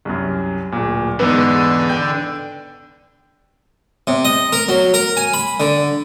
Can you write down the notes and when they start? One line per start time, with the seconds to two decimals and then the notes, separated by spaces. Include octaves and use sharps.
0.05 C2 F#2
0.72 D1 A#2
1.20 E2 G#2 D3 B3
1.90 G5 G6
4.07 C3
4.25 D#5
4.53 A#4
4.69 F#3
4.94 A#4
5.17 G#5
5.33 B5
5.60 D3